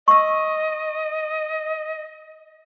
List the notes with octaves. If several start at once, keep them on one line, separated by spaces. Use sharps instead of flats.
D#5 C#6 E6